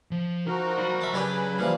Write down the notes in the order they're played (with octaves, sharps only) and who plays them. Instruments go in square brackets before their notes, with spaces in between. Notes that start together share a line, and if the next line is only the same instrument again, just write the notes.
[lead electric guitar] F3
[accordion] F3 F#4 A#4 [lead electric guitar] D#4
[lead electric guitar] D5 B5
[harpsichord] E5 A5
[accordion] C#3 B4 G#5 [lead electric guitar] F#3 [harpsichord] D4 G4 D5
[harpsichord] A#2 E3 [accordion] F3 G3 F5